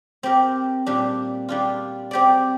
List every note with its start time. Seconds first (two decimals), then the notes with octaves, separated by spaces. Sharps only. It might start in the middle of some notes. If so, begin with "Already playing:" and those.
0.23 C4 G4 A#4
0.86 A#2 G3 D4
1.49 G3 D4 F4
2.11 C4 G4 D5